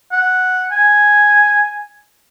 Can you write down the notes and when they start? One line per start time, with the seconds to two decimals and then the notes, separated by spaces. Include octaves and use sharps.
0.12 F#5
0.72 G#5